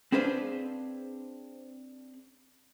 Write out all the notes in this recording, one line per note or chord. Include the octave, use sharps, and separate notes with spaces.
C4 D4 G#4 B4 C5 F5